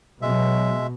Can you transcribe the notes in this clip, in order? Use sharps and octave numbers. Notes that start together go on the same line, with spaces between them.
B2 F#3 G#3 E5